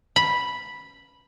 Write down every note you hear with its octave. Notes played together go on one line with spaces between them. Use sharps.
B5